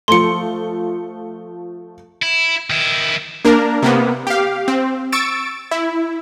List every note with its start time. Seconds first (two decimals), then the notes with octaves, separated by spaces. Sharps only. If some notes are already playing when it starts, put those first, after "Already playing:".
0.08 F3 A3 C6 C#7
2.22 E4
2.70 D#3 E4
3.45 A#3 D4 A#4
3.82 C3 A#3 B3
4.27 G4 F5
4.68 C4
5.12 C#6 E6 A6 D7
5.71 E4